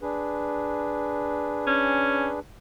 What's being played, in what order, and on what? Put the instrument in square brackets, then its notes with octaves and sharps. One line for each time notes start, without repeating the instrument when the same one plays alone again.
[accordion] D4 G#4 B4
[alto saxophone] C#4